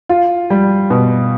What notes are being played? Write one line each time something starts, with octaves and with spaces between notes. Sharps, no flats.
F4
G3
B2